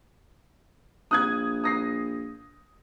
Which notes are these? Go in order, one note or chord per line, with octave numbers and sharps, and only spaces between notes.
A#1 D#6 F#6 G#6
D#6 A#6 C7